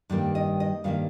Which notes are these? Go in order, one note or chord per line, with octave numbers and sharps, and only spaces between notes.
G2 D#3 G3 A#3
D#5
D#5
G2 D#3 G3 A#3 F5